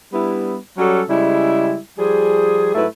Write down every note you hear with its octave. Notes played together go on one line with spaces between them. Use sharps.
G3 B3 D4 E4
F#3 G3 C#4 F#4 A4
C#3 G3 G#3 E4
F3 G3 G#4
G#2 F#3 A3 E4 B4